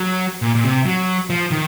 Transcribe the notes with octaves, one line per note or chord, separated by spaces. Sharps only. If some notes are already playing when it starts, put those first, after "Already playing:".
Already playing: F#3
A#2
A#2
C3
F#3
F3
D#3